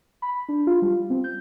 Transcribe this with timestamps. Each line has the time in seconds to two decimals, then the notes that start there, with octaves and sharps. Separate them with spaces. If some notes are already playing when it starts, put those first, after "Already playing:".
0.22 B5
0.49 D4
0.67 F4
0.82 G3
1.10 C4
1.24 G6